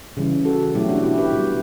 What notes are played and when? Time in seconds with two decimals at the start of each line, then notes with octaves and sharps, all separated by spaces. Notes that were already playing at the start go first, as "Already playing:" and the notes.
0.17 C#3 E3 G3
0.45 F#4 A4
0.74 B2 F#3 A3 E4 G4
0.89 D4 F#4
1.04 E4 G4
1.18 G4 B4
1.32 B2 G3